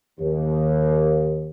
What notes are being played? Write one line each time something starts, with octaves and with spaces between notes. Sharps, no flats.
D#2